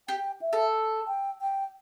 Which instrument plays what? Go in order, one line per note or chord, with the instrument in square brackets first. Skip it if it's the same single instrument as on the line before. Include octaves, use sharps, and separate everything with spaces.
[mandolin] G4 [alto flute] G5
[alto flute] E5
[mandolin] A4
[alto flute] G5
G5